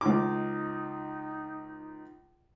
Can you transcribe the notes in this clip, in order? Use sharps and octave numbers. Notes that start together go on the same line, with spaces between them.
C#2 D#4 D6